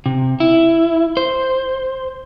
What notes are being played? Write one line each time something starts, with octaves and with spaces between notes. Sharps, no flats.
C3
E4
C5